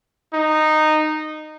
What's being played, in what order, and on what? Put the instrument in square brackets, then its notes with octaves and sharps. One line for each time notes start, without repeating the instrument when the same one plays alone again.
[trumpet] D#4